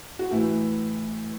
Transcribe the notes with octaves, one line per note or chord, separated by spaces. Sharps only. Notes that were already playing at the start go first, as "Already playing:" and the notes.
F#4
A2 E3 E4